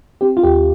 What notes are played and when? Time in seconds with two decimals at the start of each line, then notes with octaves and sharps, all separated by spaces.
0.21 C4 G4
0.37 F4
0.43 D#2 G4